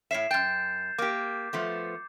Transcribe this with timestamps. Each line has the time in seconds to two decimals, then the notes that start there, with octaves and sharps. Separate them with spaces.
0.11 A2 C#5 E5 C7 E7
0.31 F#2 G5 G6 A6
0.98 A#3 G4 D6
1.53 F3 A3 B3